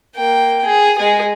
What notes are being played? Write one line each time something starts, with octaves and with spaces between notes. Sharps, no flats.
A#3 G5
G#4
G#3 G#4